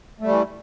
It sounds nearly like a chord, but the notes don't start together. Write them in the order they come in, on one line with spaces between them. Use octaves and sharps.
A3 G3 E3